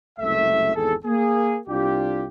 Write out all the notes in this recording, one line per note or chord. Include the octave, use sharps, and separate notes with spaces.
F#1 C2 A3 E5
G#1 E2 G#4 A4
A#3 G#4
C2 D4 F4 G4